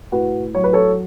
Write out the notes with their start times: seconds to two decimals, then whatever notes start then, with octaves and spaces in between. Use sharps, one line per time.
0.12 A2 F#4 B4
0.54 F#3 C#5
0.64 B4
0.73 A4 C#5